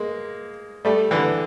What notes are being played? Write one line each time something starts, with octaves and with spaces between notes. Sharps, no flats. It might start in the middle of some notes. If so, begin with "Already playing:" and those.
Already playing: G#3 A#3
G3 A3
D3 E3